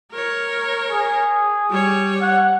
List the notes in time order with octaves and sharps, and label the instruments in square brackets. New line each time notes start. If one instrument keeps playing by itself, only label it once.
[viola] A#4 C#5
[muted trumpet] G#4
[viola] G3 C#5
[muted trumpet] F#5